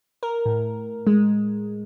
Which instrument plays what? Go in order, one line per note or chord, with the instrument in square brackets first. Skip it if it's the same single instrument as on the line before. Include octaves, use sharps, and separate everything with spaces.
[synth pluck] A#4
A2
G#3